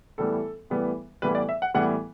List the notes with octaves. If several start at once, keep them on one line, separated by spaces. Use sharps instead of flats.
A2 E3 G3 B3 A4
A2 E3 G3 B3
A2 E3 G3 B3 B4
D5
E5
F#5
A2 E3 G3 B3 F#5